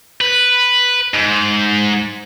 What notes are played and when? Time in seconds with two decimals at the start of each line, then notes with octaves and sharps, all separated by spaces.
0.21 B4
1.14 G#2